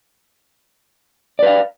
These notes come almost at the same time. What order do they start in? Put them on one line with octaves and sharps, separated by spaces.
D5 B4 F5